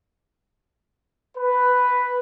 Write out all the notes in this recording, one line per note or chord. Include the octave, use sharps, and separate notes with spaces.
B4